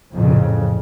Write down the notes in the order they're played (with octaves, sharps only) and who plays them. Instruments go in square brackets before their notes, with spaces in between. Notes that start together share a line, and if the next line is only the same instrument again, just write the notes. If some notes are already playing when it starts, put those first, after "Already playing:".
[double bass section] A1 F2 A#2 C#3